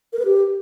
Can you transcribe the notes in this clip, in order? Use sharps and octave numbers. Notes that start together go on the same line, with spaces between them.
A#4
B4
G4